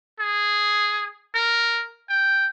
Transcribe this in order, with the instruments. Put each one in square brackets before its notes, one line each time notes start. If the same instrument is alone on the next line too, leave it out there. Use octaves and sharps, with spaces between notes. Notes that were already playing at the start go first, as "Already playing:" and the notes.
[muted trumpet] G#4
A#4
G5